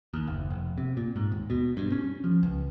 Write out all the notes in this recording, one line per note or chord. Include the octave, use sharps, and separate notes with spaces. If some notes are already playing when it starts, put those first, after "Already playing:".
D#2
F#1
F1
C3
A#2
G#2
D#1
B2
G2
C#4
F3
C#2